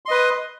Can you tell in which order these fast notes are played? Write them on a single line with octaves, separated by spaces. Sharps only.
C6 D#5 B4 D#6